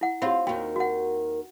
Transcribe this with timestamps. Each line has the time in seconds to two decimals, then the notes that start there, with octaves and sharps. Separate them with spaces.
0.01 E4 F#5
0.22 C4 F4 G4 C#5 B5
0.47 D#2 D#3 F#4 G5
0.76 F#4 F#5